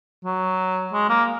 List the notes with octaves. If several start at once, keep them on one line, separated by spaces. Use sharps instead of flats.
F#3
G#3
A#3